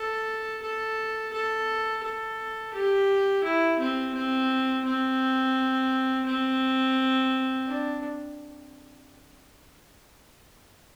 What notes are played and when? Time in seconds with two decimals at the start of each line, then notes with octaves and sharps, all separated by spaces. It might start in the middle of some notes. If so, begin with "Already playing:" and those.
Already playing: A4
0.62 A4
1.33 A4
2.03 A4
2.74 G4
3.44 E4
3.79 C4
4.14 C4
4.85 C4
6.26 C4
7.67 D4